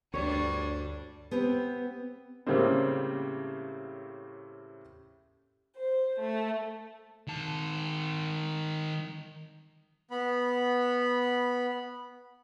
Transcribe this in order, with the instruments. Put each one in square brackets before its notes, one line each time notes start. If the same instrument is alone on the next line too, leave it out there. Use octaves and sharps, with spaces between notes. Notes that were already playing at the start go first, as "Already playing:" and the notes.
[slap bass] D2 [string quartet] G2 G3 D4 [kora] C#5
[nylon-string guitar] B3 C4 G4 B4
[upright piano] A2 C#3 G3 A#3 C4
[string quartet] C5
A3
[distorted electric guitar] D#3 A5
[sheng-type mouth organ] B3 B5